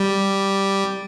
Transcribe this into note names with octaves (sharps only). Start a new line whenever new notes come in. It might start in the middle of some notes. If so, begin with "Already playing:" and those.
Already playing: G3